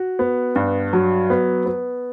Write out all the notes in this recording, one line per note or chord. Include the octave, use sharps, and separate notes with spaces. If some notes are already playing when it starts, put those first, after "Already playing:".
Already playing: F#4
B3
G2
F#3
B3
B3